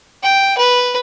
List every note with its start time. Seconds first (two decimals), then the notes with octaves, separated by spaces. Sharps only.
0.23 G5
0.58 B4